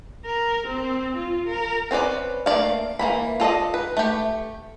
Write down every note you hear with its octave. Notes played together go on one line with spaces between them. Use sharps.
A#4
C4
F4
A#4
C4 C#4 B4 D5
A3 A#3 E4 D5 F5
E3 A#3 B5
F4 A4 D5 D#5
B4
A3 G4